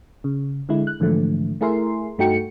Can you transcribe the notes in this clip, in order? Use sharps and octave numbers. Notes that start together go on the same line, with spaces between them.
C#3
D3 G#3 E4
F#6
G#2 D3 E3 F3 A3
A3 E4 G#4 A#4 E5 C6
G2 A3 D#4 F#4 G5 C#7